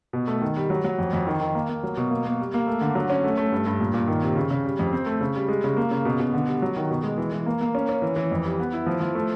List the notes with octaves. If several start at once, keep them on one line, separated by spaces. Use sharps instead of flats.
B2
A3
D#3
G3
F#3
F#3
F2
F2
D#3
D#3
A#3
A#3
F#3
B2
A#3
A#3
G3
A#3
A3
D3
F#3
C#4
A3
A3
G2
G2
A#2
A#2
D#3
C3
C#3
C#3
G3
F2
C4
A3
C#3
G3
G#3
C#3
A#3
C#3
B2
B2
D3
G3
F#3
D#3
B2
G#3
E3
E3
A#3
A#3
C#4
C#4
E3
E3
F2
G3
B3
E4
F3
F3
A3